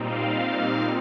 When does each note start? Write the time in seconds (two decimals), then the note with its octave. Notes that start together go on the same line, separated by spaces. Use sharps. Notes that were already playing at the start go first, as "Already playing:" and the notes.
Already playing: A#2 G3 C4 D#4
0.10 F5